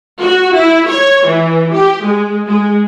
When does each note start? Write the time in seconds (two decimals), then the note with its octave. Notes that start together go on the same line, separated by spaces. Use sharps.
0.21 F#4
0.56 E4
0.90 C#5
1.26 E3
1.74 G4
2.04 G#3
2.47 G#3